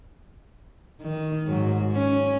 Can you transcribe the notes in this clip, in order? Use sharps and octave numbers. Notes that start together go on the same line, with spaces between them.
D#3
G#2 F#3
C#4